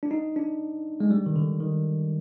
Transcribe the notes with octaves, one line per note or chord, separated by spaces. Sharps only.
D4
D#4
D4
G#3
G3
D#3
D3
D#3